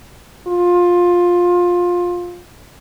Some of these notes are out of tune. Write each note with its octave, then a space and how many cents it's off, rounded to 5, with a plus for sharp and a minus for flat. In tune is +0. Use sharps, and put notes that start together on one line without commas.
F4 +15